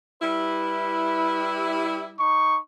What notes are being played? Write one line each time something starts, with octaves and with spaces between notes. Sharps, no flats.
G3 E4 B4
D#4 C#6